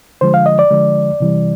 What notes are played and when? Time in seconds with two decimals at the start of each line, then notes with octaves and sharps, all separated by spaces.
0.21 D3 F3 G#3 C5
0.34 F5
0.46 D#5
0.59 D5
0.71 D3 F3 G#3
1.20 C3 E3 G3